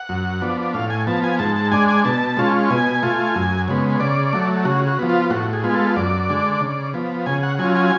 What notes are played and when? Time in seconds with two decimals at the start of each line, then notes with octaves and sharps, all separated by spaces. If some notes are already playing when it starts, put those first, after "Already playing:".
Already playing: F#5
0.09 F#2
0.42 F3 B3 D4
0.74 A2 F5
0.90 G#5
1.07 F3 B3 A5
1.24 G#5
1.39 G#2 A5
1.56 A5
1.71 G#3 D4 G#5
1.89 G#5
2.05 B2 A5
2.37 G#3 C#4 F4
2.70 B2 G#5
3.03 A3 F4
3.36 F#2
3.68 C#3 G#3 B3
4.00 C#3 D5
4.33 F#3 A3
4.65 C#3 F#4
4.87 F#4
4.99 F3 B3
5.10 F4
5.30 A2 F#4
5.53 G#4
5.63 G#3 B3 F4
5.70 G#4
5.74 A4
5.96 F#2 D5
6.29 D3 G#3 D4
6.61 C#3
6.94 F3 B3
7.26 C#3 G#5
7.43 F#5
7.59 F#3 C#4 F4 G#5
7.75 G#5